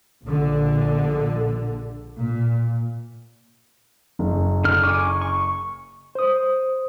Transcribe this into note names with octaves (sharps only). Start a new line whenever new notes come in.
A#1 D3
A#2
F#1
D3 F6
G#5 C#6 D6
C#6
C5 D#6